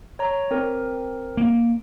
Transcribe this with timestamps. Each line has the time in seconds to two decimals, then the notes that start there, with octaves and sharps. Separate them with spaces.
0.19 C#5 A#5
0.51 C4 A#4
1.37 A#3